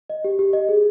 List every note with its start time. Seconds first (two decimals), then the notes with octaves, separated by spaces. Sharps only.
0.10 D#5
0.24 G4
0.39 G4
0.53 D#5
0.69 G#4